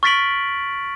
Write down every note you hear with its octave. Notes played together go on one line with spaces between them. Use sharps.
C#6 F6 A6 B6 D7 F#7